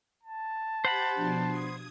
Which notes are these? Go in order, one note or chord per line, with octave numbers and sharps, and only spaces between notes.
A5
G4 C5 F#5 B5 G6 A6
B2 F3 D4
D#6 G#6